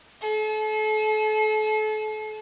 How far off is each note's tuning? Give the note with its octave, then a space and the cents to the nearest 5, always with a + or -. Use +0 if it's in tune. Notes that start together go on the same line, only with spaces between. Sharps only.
A4 -35